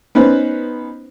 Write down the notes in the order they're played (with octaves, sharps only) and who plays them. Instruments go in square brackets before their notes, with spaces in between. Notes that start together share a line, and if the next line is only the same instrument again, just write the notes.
[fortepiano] B3 C#4 D#4 B4 C5